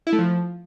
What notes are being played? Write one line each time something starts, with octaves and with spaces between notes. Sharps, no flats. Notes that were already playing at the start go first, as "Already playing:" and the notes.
E4
A3
F3